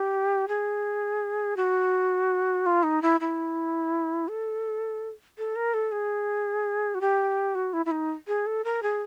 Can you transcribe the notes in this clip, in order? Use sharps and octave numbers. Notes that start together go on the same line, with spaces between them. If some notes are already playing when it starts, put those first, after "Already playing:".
Already playing: G4
G#4
F#4
F4
D#4
E4
E4
A4
A4
A#4
A4
G#4
F#4
G4
F#4
E4
E4
D#4
G#4
A4
A#4
G#4